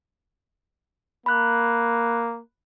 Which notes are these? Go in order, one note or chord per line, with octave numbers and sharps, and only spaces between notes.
A#3 B5 F#6